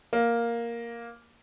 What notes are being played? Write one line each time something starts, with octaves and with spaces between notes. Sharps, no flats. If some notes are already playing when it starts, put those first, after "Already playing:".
A#3